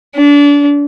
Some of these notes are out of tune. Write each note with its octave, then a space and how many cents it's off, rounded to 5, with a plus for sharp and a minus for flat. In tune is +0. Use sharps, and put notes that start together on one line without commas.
D4 -30